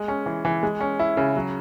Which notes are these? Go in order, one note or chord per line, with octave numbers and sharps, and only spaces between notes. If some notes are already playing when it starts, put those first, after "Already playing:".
Already playing: G#3
C#4
E3
E3
G#3
C#4
E4
C#3
F#3